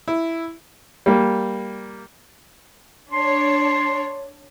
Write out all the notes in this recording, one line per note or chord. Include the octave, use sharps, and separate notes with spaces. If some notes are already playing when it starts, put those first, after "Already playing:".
E4
G3 A#3
D4 C#5 C6